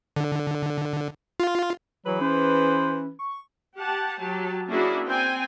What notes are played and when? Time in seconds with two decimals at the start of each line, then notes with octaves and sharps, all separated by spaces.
0.16 D3
1.40 F4
2.06 E3 F#3 G#4 B4
2.21 C#4 C5
3.19 C#6
3.77 G4 F#5 A5
4.19 F#3 G4 A5
4.68 A#3 C#4 D4 E4 F#4 G#4
5.06 C4 G5 G#5